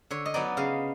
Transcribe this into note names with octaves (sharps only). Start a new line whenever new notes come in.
D3 C#5
D#5
F#3 B3 D#4 D5
C#3 F5